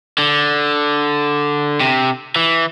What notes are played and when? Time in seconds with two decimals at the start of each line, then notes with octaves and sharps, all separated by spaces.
0.18 D3
1.81 C3
2.36 E3